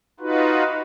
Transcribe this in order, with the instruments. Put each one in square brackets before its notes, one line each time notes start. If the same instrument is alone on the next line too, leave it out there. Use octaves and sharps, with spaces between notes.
[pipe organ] D#4 F4 F#4 B4